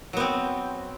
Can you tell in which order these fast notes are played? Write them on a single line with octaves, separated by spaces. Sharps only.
F#3 B3 C4